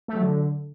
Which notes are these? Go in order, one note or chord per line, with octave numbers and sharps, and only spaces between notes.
A3
F#3
D3